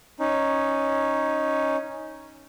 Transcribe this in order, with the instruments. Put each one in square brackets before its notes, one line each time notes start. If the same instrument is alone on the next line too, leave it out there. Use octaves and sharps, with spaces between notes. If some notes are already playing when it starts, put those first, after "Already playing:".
[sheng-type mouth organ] C#4 D#4